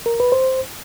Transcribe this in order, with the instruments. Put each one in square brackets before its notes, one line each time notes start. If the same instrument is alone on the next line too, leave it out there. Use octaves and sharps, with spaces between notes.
[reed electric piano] A#4
B4
C5